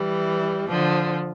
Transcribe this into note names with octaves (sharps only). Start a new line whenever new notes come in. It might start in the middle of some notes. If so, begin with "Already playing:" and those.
Already playing: E3 G3
D3 F3